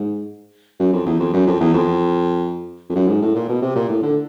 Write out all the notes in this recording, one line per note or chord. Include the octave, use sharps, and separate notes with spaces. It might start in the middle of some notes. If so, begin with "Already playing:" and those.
Already playing: G#2
F#2
F2
E2
F2
F#2
F2
E2
F2
F2
F#2
G#2
A2
A#2
B2
C3
A#2
A2
D3